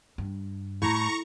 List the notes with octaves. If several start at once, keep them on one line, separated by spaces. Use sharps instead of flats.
G2
A2 A#5 C#6